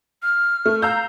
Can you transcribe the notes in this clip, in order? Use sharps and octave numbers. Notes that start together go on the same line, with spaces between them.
F6
A3
F5 A#5 E6 G6